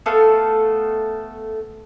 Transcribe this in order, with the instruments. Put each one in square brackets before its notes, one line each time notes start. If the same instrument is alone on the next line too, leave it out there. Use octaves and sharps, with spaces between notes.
[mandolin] A3 B3 A4 F5